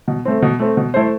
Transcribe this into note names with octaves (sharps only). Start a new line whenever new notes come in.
B2
A3 C4
B2
A3 C4
B2
A3 E4 A4 C5